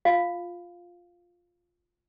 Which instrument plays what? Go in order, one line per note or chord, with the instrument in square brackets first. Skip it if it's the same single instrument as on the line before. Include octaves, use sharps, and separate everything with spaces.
[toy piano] F4 F5